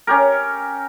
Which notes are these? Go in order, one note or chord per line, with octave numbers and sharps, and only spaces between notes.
C#4 G4 A#4